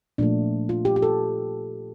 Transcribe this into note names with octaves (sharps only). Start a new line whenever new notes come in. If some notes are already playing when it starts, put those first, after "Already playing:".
A#2 F3 A3 D4
F4
G4
G4
A4